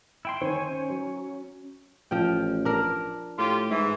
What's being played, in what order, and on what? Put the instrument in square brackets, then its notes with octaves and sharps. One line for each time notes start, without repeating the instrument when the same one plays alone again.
[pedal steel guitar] E4 G5 C6
[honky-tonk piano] D#3 C5 [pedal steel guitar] C#5 G#5
[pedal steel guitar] C#4
[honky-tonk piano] F#3
[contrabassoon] A1 [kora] F3 G5
[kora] D4 A#4
[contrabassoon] A2 [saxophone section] F4 G4
[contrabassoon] G#2 [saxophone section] E3